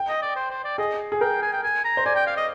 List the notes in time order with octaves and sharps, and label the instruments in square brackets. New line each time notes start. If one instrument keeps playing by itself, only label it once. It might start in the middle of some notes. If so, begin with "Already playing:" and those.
Already playing: [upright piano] G5
[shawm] D#5
D5
C5
C5
D5
[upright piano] G#4 [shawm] D#5
[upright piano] G#4
[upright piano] A#4 [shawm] G5
[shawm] G#5
G5
G#5
A#5
[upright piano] C5
[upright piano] D5 [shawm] G#5
[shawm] G5
F5
D#5